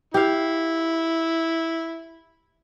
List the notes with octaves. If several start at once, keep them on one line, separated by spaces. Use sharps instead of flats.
E4 G4 F5